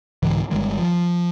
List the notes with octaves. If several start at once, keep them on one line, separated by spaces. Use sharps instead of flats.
C2 G#2 D3 E3
G1 D#3 G3 G#3
F3